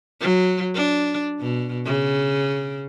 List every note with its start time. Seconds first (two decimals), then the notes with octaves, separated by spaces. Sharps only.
0.21 F#3
0.75 D4
1.41 B2
1.86 C#3